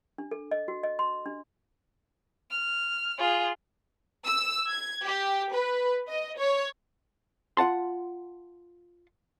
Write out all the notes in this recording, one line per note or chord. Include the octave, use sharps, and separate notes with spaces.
D4
A4
D#5
F#4
D#5
C6
D4
F6
F4 G#4
E6
G#6
G4
B4
D#5
C#5
F4 F#5 A5 C6